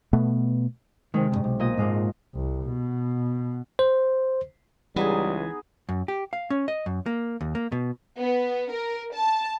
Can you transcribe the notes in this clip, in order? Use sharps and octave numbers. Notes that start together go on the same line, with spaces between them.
B2 A3 B3
C3 D#3 G#3
C#2 G2
B1
A#2 D#5
G#2 G#3 A#3
C2
B2
C5
C#2 E3 G3 B3 D#4 G#4
F#2
G4
F5
C#4
D#5
F#2
A#3
D#2
A#3
B2
B3
A#4
A5